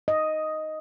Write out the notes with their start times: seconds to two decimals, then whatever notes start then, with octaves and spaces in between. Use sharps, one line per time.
0.08 D#5